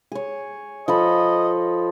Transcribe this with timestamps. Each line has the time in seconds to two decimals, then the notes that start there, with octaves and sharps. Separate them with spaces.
0.12 G#4 C#5
0.88 F3 A4 D#5 B5